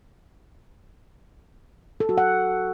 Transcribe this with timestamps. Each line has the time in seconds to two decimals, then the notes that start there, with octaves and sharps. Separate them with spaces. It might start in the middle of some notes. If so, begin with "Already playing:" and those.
2.00 A4
2.09 F#4
2.18 F#5